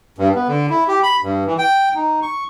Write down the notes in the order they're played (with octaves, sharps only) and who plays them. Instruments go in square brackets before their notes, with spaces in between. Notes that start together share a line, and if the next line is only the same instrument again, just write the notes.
[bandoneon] G2
B3
D3
E4
G4
B5
G2
E3
G5
D#4
C#6